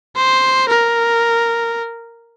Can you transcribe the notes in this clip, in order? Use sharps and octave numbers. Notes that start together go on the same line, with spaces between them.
C5
A#4